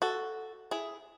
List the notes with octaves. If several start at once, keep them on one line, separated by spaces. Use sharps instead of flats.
F#4 A4
E4 G#4